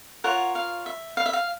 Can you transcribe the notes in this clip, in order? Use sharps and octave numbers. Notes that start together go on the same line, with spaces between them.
F4 A#4 C#5 F#5
F5
E5
F5
E5
F5